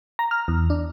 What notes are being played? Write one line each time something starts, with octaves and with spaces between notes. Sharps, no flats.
A#5
F6
E2
D4